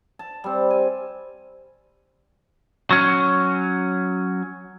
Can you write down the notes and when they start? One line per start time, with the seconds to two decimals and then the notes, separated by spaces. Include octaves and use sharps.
0.19 A5
0.44 G3 C4
0.70 G#5
2.91 F#3 C#4